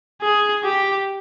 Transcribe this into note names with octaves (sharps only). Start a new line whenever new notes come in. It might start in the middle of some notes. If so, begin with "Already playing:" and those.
G#4
G4